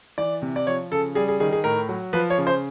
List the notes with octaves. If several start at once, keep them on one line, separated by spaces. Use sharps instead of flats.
E3 D5
C3
D5
F3 C#5
C#3 A4
G3 G#4
G#4
D#3 G#4
G#4
A2 A#4
F#3
F3 B4
C#5
C#3
C5